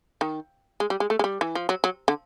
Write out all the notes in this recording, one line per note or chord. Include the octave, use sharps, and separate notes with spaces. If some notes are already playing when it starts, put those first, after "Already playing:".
D#3
G#3
G3
G#3
A3
G#3
G3
E3
F3
F#3
F#3
D3